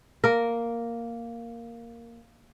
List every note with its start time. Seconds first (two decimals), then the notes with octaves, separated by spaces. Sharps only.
0.24 A#3 A#4